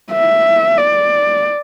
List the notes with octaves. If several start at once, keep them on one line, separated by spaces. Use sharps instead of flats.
E5
D5